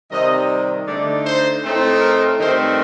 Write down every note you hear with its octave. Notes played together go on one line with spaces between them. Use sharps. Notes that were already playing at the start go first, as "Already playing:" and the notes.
C3 D#3 G3 D#5
D3 A3 D#4 D5
C5
A2 A3 C4 D#4
A#4
G2 D#3 A3 C4 C5